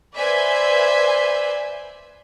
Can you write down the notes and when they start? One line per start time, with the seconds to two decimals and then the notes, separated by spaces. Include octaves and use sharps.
0.15 B4 C5 D5 E5 G#5